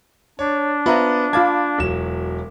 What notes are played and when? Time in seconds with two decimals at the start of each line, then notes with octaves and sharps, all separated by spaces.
0.39 D4 C#5
0.86 B3 F4 B4 C5 E5 A#5
1.33 F4 F5 A5 B5 D6 G#6
1.79 E1 F#3 E7